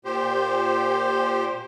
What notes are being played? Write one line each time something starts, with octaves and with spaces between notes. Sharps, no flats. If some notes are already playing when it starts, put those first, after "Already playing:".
A#2 G4 C5